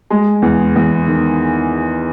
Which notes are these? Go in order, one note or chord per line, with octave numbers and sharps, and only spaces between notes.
G#3
E2
E2
D#3